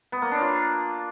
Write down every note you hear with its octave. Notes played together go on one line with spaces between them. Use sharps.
B3
A#3
D4
F4